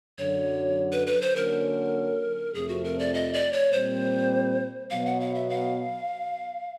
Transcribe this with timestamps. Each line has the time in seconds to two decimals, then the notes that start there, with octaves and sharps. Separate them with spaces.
0.18 F#2 D3 F#3 C#5
0.92 B4
1.07 B4
1.21 C5
1.35 D3 F#3 A#3 C#4 A#4
2.54 F2 C3 F3 A3 G#4
2.68 F#4
2.84 A#4
2.99 D5
3.14 D#5
3.33 D5
3.52 C#5
3.72 A#2 G3 C4 C5
4.90 B2 F#3 B3 F5
5.06 F#5
5.20 F5
5.35 E5
5.49 F5